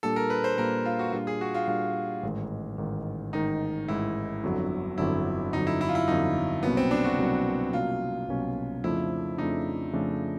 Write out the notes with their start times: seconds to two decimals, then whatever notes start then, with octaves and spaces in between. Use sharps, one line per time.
0.03 A#2 G3 A#3 D4 A4
0.16 A#4
0.30 B4
0.44 C5
0.57 A#2 G3 A#3 D4 A#4
0.85 F4
0.99 F#4
1.13 A#2 G3 A#3 D4 F4
1.27 G#4
1.41 F#4
1.54 F4
1.68 A#2 G3 A#3 D4 F4
2.23 A1 G#2 D#3
2.78 A1 G#2 D#3
3.33 A1 G#2 D#3 D#4
3.88 A1 G#2 D#3 E4
4.43 G1 F2 D3 F#3
4.98 G1 F2 D3 F#3 E4
5.53 G1 F2 D3 F#3 D#4
5.67 E4
5.81 E4
5.89 F4
5.95 E4
6.08 G1 F2 D3 F#3 D#4
6.63 C2 B2 F#3 A#3 B3 C#4
6.77 C4
6.91 D4
7.04 F#4
7.18 C2 B2 F#3 A#3 C#4
7.73 C2 B2 F#3 A#3 C#4 F4
8.28 C2 B2 F#3 A#3 C#4
8.83 F2 C#3 F3 A3 D4 E4
9.38 F2 C#3 F3 A3 D4 D#4
9.93 F2 C#3 F3 A3 D4